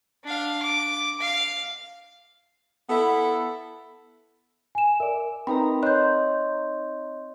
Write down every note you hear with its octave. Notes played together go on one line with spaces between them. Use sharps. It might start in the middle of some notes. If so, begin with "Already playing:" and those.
D4 F5
D6
F5
B3 E4 A4
G#5 E7
A#4 D5 E5
C4 D#4 A#4 B4 G5 A#5 B5
C#5 D#5 C6 F#6 G6